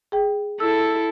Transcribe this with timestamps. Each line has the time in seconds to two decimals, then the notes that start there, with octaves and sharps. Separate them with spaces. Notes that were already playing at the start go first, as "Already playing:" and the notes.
0.12 G#4 G5
0.60 E4 A4 E6